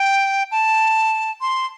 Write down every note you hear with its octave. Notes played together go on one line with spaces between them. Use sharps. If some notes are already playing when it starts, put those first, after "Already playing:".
Already playing: G5
A5
C6